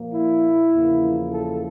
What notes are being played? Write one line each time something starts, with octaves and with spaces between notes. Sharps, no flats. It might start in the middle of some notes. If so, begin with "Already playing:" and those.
Already playing: A#2 F3 A#3
E4
E2 C#3 F3 A#3
A4